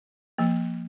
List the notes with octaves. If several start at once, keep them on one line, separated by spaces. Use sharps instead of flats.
F3 A#3